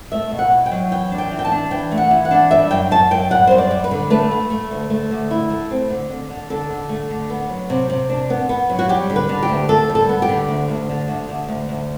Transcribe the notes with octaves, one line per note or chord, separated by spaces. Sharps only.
A3 E5
B2
F#5
E4
G5
F#3
E3 G5
D4
G5
E3
G5
A5
D4
E3 G5
A3
F#5
E3
F#5
D4
G3 E5
F#2 G5
F#2 A5
F#2 G5
G3 F#5
F#2 C5
D5
G3
B4
D3
A3 B4
A3
A3
D2
A3
D2
E4
A3
C4
D3
D3
D3
D3 A4
D3
A3
D3
B3
F#3
C3
C3
D4
B3
B3
F#3
F#4
G3 G4
D3
B4
D3
G4
D2
D2 A4
G3
A4
B3
G4
D3
D2
D2
D3
D2
D2
D2
D2